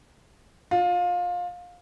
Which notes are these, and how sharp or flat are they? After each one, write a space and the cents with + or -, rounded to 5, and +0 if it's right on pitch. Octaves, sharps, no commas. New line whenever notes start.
F4 +25